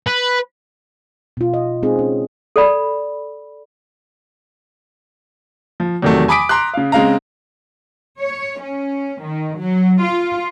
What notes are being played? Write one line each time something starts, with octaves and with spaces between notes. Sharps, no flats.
B4
B2 F4
D#5
G#3 C4 D#4 G#4 D#5
C#4
A4 D5 B5
F3
E2 C3 D#3 F#3 A3
G#5 B5 D6 D#6 B6 D7
A#5 C6 D6 F#6
C#3 F5
C#3 G#3 C4 F5 A#5
C#5
C#4
D#3
F#3
F4